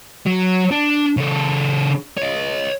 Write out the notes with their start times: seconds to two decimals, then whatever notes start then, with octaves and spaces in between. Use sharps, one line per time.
0.26 F#3
0.71 D4
1.17 C#3 A4
2.18 C#5 D#5